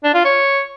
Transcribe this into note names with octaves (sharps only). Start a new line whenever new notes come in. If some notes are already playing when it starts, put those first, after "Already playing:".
D4
F4
C#5